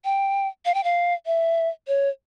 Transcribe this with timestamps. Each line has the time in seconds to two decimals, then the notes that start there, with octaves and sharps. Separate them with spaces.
0.05 G5
0.65 F5
0.74 G5
0.84 F5
1.26 E5
1.88 C#5